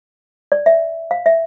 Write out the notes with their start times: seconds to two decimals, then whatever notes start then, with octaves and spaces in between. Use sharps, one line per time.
0.52 D5
0.66 E5
1.11 F5
1.26 E5